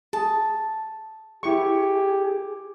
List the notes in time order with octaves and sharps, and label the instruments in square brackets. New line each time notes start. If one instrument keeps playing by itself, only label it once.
[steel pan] G#4 [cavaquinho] A5
[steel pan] E4 C#6 [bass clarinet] G4 [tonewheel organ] G#4